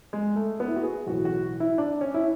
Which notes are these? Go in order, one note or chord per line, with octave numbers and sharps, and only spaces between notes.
G#3
A3
B3
E4
F#4
G#4
B1 A2 E3 F#4
F#4
E4
D4
C#4
E4